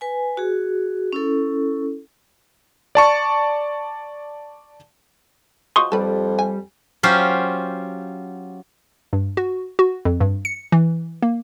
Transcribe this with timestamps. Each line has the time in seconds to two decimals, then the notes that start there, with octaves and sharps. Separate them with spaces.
0.01 B4 G#5
0.37 F#4 G#4
1.13 C#4 E4 A4
2.95 D5 A5 C#6
5.76 F3 F#3 G#3 C6 C#6 D#6
5.92 F2 G3 A4 B4
6.39 G#5
7.03 F#3 C#4 F4 G4 C5
9.13 G2
9.37 F#4
9.79 F#4
10.05 F2
10.21 G2
10.45 C#7
10.72 E3
11.23 A#3